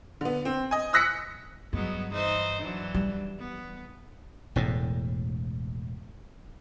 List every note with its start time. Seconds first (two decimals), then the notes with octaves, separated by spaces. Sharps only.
0.21 D3 B3
0.45 C4
0.71 D#5 G#5
0.93 D#6 E6 F#6 A#6 B6 C#7
1.73 G2 F#3 G#3 B3
2.12 E3 D#4 C5
2.61 E3 F#3 D4
2.94 G3
3.39 B3
4.56 E1 E2 A2